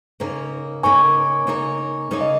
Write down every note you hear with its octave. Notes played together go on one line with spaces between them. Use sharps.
C#3 A#3 D#4 A#4 C#5
C#3 A#3 D#4 A#4 C#5 G#5 C#6
C#3 A#3 D#4 A#4 C#5
C#3 A#3 D#4 A#4 C#5
D#5